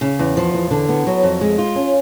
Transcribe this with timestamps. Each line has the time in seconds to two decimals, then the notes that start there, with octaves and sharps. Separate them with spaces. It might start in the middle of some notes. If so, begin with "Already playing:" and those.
0.01 C#3
0.19 E2
0.37 F3
0.53 E2
0.71 D3
0.89 B3
1.07 F#3
1.23 F2
1.41 G#3
1.58 F4
1.76 C#4